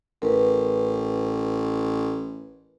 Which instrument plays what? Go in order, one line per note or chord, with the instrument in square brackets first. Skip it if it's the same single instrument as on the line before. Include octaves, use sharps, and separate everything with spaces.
[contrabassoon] A1 [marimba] A#4 B4